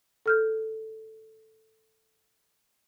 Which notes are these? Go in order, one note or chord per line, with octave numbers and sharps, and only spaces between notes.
A4 F6 G6